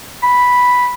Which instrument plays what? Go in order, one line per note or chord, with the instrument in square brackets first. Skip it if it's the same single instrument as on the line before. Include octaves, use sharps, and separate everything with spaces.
[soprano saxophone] B5